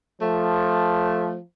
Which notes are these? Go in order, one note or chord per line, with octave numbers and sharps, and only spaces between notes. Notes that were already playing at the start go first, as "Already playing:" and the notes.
F3 A3